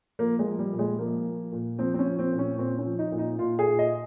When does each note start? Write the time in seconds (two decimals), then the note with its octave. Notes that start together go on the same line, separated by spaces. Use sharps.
0.19 F3 A#3
0.39 G#3
0.46 F3
0.59 G3
0.72 A#2
0.79 G#3
0.99 F3 A#3
1.26 F3
1.52 A#2
1.79 F3 C4
1.94 C4
1.99 C#4
2.06 F3
2.19 C4
2.32 A#2
2.39 C#4
2.58 A#2 C4
2.79 C#4
2.85 F3
2.99 D#4
3.12 A#2
3.19 D#4
3.38 A#2 F4
3.59 G#4
3.66 A#2
3.79 D#5